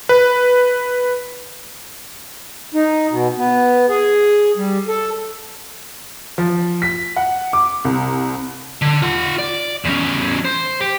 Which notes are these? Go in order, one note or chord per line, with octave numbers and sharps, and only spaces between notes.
B4
D#4
B2
B3
G#4
G3
A4
F3
B6
F#5
D6
C2
D3
F4 F#5
D5
E2 C#4
C5
G4